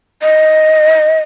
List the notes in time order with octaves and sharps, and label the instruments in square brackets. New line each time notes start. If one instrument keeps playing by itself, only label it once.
[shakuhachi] D#5